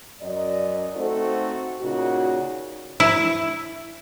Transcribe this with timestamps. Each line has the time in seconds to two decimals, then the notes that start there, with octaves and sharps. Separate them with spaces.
0.21 F#2 D5 D#5
0.95 A3 C4 D#4 F#4 A4 C5
1.81 A#2 C#3 D#4 F#4
3.00 E4